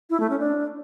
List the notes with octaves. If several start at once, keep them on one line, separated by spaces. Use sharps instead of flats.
E4
A3
C#4
D4